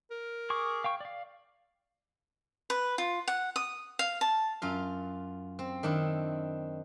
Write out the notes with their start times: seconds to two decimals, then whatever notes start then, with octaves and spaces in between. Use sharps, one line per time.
0.11 A#4
0.50 G#4 C#6 D6
0.84 F5 G5 C#6
1.00 D5 F5
2.70 B4
2.98 F4
3.28 F#5
3.56 D#6
3.99 F5
4.21 A5
4.62 F#2 F4 F5
5.59 C4
5.83 D#3 D4 E4